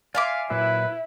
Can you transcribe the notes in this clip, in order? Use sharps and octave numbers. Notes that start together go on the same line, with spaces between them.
D5 E5 F5 G#5 C6 D6
A#2 F#3 E4 B4 E5